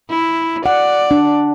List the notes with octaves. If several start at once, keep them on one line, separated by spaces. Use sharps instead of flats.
E4
D5 F#5
D4